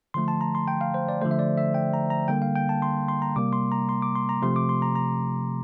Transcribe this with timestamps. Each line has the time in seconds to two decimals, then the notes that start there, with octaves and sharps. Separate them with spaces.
0.14 D3 F3 A3 C6
0.28 A5
0.41 A#5
0.55 C6
0.68 G5
0.81 F5
0.94 C5
1.09 D5
1.22 D3 F3 A3 C5
1.31 E5
1.39 D5
1.57 E5
1.74 G5
1.93 A#5
2.10 A#5
2.28 D3 G3 A#3 G5
2.42 F5
2.55 G5
2.69 A5
2.82 C6
3.08 C6
3.22 A#5
3.36 C3 G3 A#3 D6
3.53 C6
3.72 A#5
3.89 C6
4.02 D6
4.15 C6
4.29 A#5
4.42 C3 F3 A3 C6
4.56 D6
4.69 C6
4.82 A#5
4.96 A#5